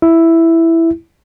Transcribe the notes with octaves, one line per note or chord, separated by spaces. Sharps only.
E4